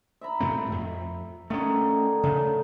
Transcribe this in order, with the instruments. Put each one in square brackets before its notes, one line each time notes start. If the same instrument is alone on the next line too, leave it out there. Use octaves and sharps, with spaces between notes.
[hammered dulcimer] E5 A#5 B5
[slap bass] A2 A3 C4
F2
[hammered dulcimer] D3 D#3 [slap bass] A3 C#4
[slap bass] C#3 [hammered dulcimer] A3